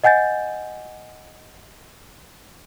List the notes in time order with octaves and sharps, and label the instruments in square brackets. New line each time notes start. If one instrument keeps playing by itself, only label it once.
[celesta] D#5 F#5 G#5 G6 A6